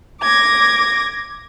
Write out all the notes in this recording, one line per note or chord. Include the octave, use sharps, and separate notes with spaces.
D6 G#6 A#6